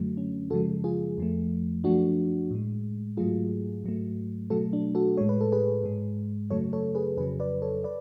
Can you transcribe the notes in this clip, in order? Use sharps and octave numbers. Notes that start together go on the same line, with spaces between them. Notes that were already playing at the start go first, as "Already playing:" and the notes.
Already playing: F#2 D3 F#3 A3
C#4
F#2 C#3 F3 G#3 F#4 A4
F4 G#4
F2 F3 A3
F#2 F3 A3 D4 F#4
A2 G#3
G#2 F#3 A3 F4 G#4
G#2 F#3 A3
B2 F#3 A3 F#4 A4
D4
F#4 A4
A2 G#3 C#5
B4
A4
G#4 B4
G#2 G#3
F#2 C#3 F#3 A3 A4 C#5
A4 C#5
G#4 B4
F2 C#3 F#3 G#4 B4
B4 D5
A4 C#5
B4 D5